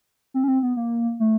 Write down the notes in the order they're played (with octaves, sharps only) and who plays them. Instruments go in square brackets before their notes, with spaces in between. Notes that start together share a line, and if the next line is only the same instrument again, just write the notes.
[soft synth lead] C4
C#4
C4
B3
A#3
A3